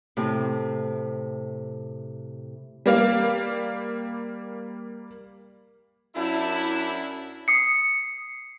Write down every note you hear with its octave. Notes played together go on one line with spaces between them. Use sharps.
A2 C3
G3 A#3 F5
F#2 D4 E4
D#6 C7 C#7